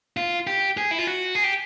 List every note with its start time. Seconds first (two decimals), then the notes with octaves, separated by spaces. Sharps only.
0.17 F4
0.47 G4
0.77 G#4
0.91 E4
0.99 F4
1.07 F#4
1.35 G#4
1.44 G4